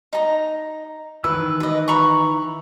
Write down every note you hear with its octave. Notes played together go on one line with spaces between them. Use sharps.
D#4 A#5
D#3 E3 B4 E6
B4 D#5
A#5 B5 C#6